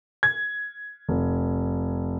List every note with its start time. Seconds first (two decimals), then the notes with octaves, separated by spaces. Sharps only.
0.23 G#6
1.08 F1